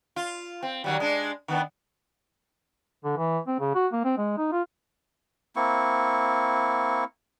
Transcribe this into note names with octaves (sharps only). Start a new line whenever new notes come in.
F4
C4
D#3 F#3 G3
G#3 D4
D#3 B3 D4
D3
E3
C4
C#3
F#4
A#3
C4
G#3
D#4
F4
A#3 C4 E4 C#6